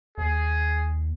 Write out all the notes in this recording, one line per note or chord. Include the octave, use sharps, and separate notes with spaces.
D#2 G#4